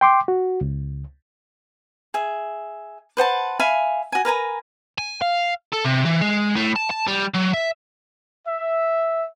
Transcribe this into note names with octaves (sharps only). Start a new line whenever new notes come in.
G5 C6 D6
F#4
C#2
G#4 E5
B4 C5 F#5 A5
E5 F5 G#5 B5
F#4 G#5
A#4 B4 G#5 A#5
G#5
F5
A4
C3
E3
G#3
A2
A5
A5
G3
F#3
E5
E5